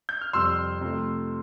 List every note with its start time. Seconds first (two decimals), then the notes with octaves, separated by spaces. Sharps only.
0.09 G6
0.21 F6
0.33 F2 C3 G3 C6 E6
0.81 C3 F3 A3